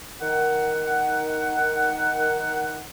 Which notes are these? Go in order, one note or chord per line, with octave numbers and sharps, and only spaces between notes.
D#3 F#5